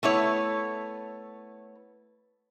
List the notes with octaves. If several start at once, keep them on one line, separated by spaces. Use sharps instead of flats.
A3 B3 E4 C#5